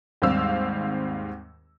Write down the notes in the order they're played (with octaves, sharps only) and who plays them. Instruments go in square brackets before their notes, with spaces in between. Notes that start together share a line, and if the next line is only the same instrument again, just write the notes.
[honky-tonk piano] D#2 G#2 G3 C4 F5 E6